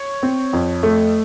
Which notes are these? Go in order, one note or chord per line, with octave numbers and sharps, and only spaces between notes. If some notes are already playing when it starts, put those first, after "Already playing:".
Already playing: C#5
C4
F2
A3